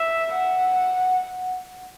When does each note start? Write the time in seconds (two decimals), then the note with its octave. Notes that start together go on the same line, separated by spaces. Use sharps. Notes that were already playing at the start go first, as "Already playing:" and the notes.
Already playing: E5
0.34 F#5